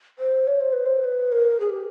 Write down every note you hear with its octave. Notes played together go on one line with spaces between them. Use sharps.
C5
C#5
C5
B4
C5
B4
A#4
G#4
G4